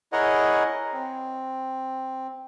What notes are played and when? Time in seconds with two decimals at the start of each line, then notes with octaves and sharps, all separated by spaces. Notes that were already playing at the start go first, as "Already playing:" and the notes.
0.13 E4 G#4 A#4 C#5 D#5 F#5
0.93 C4